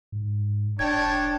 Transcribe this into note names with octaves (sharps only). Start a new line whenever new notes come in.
G#2
E1 D4 C#5 G5 A5 G#6